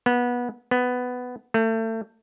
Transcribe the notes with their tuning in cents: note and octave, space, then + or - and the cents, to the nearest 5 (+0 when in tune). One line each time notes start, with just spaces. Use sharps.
B3 -20
B3 +10
A3 +30